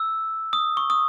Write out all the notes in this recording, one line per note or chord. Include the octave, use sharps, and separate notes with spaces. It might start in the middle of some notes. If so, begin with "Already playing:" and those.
Already playing: E6
D#6
C#6
D#6